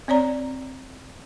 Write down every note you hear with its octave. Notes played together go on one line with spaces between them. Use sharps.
C4 C#5 D5 A#5